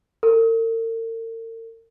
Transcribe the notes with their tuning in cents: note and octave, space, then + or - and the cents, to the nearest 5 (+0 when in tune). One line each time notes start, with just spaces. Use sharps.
A#4 -45